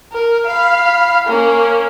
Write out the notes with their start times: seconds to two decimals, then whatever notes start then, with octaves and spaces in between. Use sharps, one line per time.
0.12 A#4
0.46 F5 B5
1.27 A#3 C#4